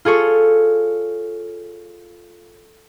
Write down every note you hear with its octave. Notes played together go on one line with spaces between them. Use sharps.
F4 G#4 A4 C#5